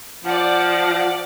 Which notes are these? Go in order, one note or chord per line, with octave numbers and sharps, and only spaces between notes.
F3 D5 F#5